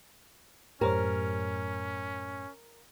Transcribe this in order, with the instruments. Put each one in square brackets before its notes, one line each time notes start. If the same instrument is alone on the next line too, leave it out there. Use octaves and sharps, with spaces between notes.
[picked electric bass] F#2 A2 [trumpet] C#4 [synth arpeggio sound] G4 C5 C#5 [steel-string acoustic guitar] A#4